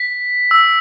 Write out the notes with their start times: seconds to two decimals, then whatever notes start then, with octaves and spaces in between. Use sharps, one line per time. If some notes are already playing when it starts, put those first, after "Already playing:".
Already playing: B6
0.51 E6